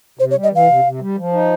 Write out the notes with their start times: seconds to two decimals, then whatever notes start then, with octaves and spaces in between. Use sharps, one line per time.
0.19 C3 C5
0.31 C#5
0.35 G3
0.43 D#5
0.52 E3 F5
0.68 C3
0.84 C3
1.01 G3
1.17 F3
1.33 D#4